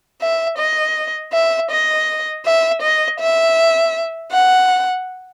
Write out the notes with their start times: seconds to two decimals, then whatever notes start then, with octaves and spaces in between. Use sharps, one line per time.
0.21 E5
0.58 D#5
1.33 E5
1.71 D#5
2.45 E5
2.82 D#5
3.20 E5
4.32 F#5